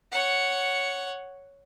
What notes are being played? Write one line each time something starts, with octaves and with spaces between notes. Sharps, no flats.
C#5 F#5